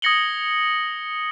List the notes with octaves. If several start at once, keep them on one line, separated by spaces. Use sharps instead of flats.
D#6 G#6 A#6 C#7 F#7 G7